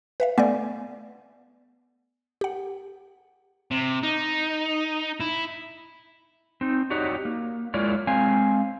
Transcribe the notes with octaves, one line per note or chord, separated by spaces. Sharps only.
B4 E5 F5
A3 B3 D5 G#5
G4 F#5
C3
D#4
E4
C4 D#4
D#4 F#4 G4 C#5 D5
A#3
G#3 E4 F4 A#4 C#5 D5
G#3 C4 F5 G#5